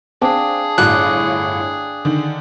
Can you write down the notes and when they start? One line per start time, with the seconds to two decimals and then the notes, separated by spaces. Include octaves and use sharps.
0.22 C4 D4 G#4 F5 G5
0.78 G1 A2 F#4 D5 F#6
2.05 D3 D#3